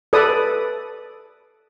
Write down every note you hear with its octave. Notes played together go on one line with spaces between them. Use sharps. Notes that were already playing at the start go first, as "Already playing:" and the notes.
A4 B4 D5 D#6